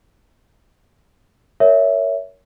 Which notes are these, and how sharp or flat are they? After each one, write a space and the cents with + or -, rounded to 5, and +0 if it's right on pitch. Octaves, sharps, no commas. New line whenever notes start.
A#4 -5 C#5 +20 E5 +0